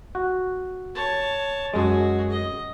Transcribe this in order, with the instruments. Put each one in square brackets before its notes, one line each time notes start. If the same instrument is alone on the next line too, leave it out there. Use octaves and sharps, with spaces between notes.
[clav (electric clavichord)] F#4
[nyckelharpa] C#5 A5
[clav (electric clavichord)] F#2 G#3 [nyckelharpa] F#4 G#4
[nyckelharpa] D#5